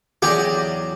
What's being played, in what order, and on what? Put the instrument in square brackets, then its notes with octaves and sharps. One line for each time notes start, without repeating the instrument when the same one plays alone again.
[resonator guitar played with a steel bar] E2 F#3 [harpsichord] G4 [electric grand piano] G#4 D5